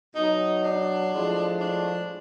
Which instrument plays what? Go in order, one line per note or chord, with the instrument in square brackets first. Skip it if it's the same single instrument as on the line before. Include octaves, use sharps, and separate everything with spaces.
[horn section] B2 F#3 D#4
D4
A2 F3 G#3
D4